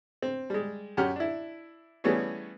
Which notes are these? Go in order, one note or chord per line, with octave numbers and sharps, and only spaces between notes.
C4
G3 G#3
F#2 C#4 G4 F#5 F6
D4 E4
E3 G3 A3 B3 C#4 G#4